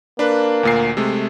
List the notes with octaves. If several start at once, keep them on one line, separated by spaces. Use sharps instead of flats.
A#3 D4 B4
D2 A#2 C7
C3 G#3 A3